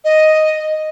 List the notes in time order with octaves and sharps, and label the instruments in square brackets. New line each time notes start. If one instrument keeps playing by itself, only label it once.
[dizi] D#5